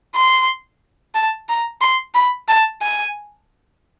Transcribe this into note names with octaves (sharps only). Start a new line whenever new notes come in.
C6
A5
A#5
C6
B5
A5
G#5